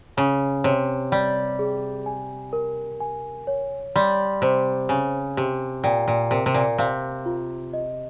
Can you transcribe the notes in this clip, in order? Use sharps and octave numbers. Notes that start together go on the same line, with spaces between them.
C#3 G#5
C3 C#5
G3 G5
G#4
G#5
A#4
G#5
C#5
G3 C6
C3 C5
C#3 G#5
C3 G4
A#2 G5
A#2
C3 A#4
C3
A#2
C3 F5
F4
D#5